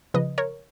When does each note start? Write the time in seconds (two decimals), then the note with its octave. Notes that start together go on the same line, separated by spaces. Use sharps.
0.14 C#3 F3 B4 D#5
0.38 A#4 C#5